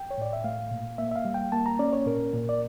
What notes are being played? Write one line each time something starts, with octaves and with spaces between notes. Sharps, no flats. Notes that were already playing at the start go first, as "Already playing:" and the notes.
Already playing: G5
C#5
A2 D5
E5
A3 F5
A#2
A#3 E5
E5
F5
G3
G5
A#3 A5
A#5
C#4 D5
C#5
A#2 A#4
A#2
D5